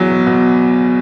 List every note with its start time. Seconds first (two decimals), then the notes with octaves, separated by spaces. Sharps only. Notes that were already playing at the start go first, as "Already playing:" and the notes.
Already playing: E2 F#3
0.10 B2
0.27 B2